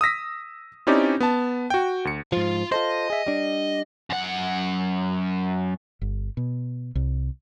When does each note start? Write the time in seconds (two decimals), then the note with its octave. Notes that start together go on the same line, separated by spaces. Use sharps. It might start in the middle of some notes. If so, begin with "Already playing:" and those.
0.01 D#6 E6 A#6 B6
0.87 C4 C#4 D#4 E4 G4 D5
1.20 B3 A5
1.70 F#4 G5
2.05 D2 C#7
2.32 G#2 F3 F4
2.72 F4 A4 C5 D#5
3.10 G#4 E5
3.27 G3 D4
4.10 F#2 F#5
6.01 G1
6.37 B2
6.95 C2